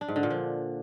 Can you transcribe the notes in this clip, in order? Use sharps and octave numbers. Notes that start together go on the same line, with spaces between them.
D4
G#2
D3
A#2
F3